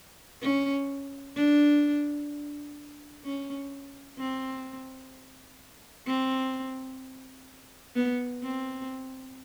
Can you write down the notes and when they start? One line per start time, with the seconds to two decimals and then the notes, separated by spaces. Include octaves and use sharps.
0.41 C#4
1.35 D4
3.24 C#4
4.18 C4
6.06 C4
7.95 B3
8.42 C4